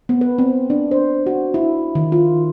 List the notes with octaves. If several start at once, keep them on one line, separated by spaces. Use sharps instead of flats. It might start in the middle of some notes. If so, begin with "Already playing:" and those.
B3
B4
C4
D4
C5
F#4
E4
D#3
F4